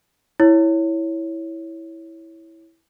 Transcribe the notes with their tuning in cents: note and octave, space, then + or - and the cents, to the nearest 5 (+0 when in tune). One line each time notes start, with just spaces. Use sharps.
E4 -5 C#5 +0